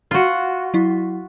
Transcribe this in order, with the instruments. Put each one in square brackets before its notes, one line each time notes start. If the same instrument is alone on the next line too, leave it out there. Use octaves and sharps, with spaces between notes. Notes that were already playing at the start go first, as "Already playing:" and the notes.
[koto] F4 F#4
[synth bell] F#3 E4 B6